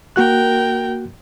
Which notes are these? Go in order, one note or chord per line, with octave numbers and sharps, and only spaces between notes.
A#3 F#4 A#4 G5 F#6